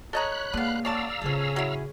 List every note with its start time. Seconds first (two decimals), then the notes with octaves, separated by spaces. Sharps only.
0.13 A4 C#5 D#5 A#5 B5 F#6
0.54 D3 G#3 A#3 B3 F5
0.85 C#4 D5 F5 F#5 A5 A#5 E6
1.21 A1 C#3 F3 C#4 G#4 A4
1.56 F#3 E4